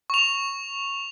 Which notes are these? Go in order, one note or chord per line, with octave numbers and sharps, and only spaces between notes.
C#6 F7